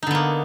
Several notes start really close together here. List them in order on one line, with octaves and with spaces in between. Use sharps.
D#4 D3 B3 A#3